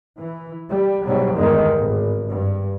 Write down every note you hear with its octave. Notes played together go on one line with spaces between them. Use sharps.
E3
G3
G#2 B2 F#3 G3
E2 G2 D3 D#3 G#3
G#1
G2